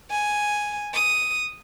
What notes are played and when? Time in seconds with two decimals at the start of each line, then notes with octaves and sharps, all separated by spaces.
0.10 G#5
0.94 D#6